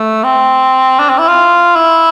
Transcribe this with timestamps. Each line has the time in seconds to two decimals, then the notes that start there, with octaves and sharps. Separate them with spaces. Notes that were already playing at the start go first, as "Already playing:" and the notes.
Already playing: A3
0.24 C4
0.99 D4
1.09 C4
1.19 E4
1.28 F4
1.76 E4